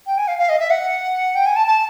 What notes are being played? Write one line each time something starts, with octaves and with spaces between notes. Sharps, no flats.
G5
G#5
F5
F5
D#5
E5
F#5
G5
G#5
A5
A5